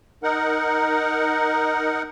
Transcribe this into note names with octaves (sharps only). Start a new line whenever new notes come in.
D#4 A#4 F#5